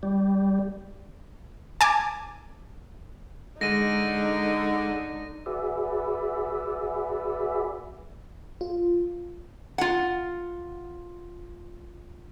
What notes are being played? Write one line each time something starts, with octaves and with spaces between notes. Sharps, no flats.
G3
G#5 A5 D6
D3 G#3 D#4 G#4 A#6 D#7
F#4 G#4 B4 D5 E5
F4
F4 F#5